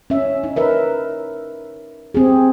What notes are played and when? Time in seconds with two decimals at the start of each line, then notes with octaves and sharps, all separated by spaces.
0.10 C#4 E5
0.44 D#4
0.56 A#4 B4 E5
2.14 C4 G4 G#4